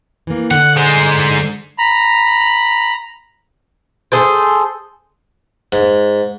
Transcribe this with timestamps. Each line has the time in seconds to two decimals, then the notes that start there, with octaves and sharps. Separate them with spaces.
0.27 E3 A#3
0.51 D3 F#5
0.77 G#3 C5
1.78 A#5 B5
4.12 G#4 A4 C5
5.72 G#2